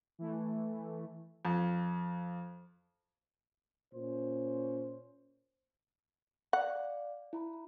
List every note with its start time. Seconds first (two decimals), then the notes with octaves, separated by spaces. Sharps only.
0.19 E3 A3
1.45 F2
3.94 A#2 C#4 C5
6.53 D5 F5 F#5
7.33 E4 A#5 B5